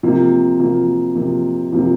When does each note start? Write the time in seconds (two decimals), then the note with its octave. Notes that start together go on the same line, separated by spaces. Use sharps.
0.03 C3 F3 A#3
0.60 C3 F3 A#3
1.16 C3 F3 A#3
1.73 C3 F3 A#3